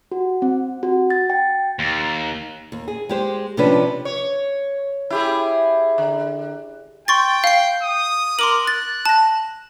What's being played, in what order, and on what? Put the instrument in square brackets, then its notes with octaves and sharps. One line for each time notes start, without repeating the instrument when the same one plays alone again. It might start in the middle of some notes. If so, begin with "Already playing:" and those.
[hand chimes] F#4
C4
F#4
A6
G5
[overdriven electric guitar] D#2
[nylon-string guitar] D#2
G#4
G#3 G4 C5
C3 F3 C#4 D4 B4
[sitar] C#5
E4 G4 G#4
D3
[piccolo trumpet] G5 [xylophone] C6 C#6 A6
[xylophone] F5 C7
[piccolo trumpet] D#6
[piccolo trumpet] A#4 [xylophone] C6 D6 F#7
[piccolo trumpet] F#6 [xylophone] A6
[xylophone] A5 A#6